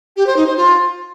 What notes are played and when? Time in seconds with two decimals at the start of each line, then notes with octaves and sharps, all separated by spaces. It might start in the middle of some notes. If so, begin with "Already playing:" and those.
0.16 G4
0.26 C5
0.36 D#4
0.47 C5
0.57 F4